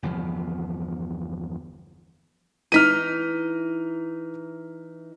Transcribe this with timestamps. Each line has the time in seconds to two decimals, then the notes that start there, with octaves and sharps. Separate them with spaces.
0.03 G1 E2 C3 F3
2.72 E3 D#4 F6 B6 D#7